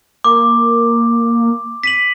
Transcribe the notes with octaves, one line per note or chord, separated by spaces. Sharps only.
A#3 D6
B6 D#7 F#7